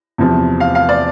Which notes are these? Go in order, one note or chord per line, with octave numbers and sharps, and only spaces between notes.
E2 C3 F3
F5
F5
D5